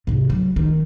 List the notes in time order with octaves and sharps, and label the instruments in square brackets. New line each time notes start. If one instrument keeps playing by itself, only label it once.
[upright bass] G#2 C3
F#3
D#3